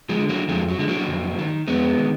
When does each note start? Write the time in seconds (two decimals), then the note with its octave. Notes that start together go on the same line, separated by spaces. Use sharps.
0.09 F3 G#3
0.19 D3
0.29 F#3 A#3
0.49 F2 F3 G#3
0.69 F#3
0.79 D3 G#3
0.88 F#3 A#3
1.08 F2
1.38 D#3
1.67 F2 G#3 B3
1.98 D#3